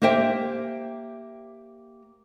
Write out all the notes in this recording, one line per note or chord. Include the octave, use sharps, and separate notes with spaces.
A#3 G4 C5 E5 G5